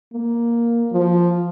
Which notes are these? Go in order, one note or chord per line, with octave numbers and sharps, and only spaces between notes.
A#3
F3